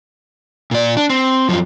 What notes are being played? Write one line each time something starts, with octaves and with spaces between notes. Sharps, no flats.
A#2 D5
D4
C4
F#2 F3